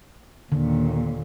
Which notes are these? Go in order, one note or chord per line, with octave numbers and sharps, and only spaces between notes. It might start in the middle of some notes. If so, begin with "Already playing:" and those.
D#2 A#2 D3